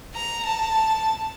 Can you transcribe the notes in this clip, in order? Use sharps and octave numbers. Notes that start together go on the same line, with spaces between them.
A#5
A5